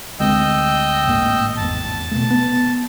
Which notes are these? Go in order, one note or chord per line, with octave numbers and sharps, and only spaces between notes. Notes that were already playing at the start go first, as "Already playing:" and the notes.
D2 G#3 C4 D#5 G5 E6
G#1 A2 A#3
G#1 E2 A5
B2 A3
B3